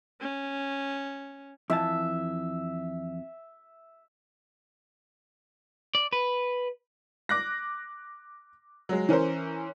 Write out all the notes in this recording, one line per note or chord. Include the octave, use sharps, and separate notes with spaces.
C#4
F2 E3 E5 A5
D5
B4
D6 F#6 A#6
F#3 G#3
E3 C#4 A#4 C5